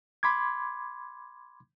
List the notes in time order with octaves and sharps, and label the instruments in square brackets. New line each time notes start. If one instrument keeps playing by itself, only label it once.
[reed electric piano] B5 C6 D6 G#6